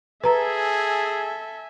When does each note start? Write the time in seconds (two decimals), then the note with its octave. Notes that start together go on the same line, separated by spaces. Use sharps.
0.24 G#4 A4 B4 E5 G#5 A#5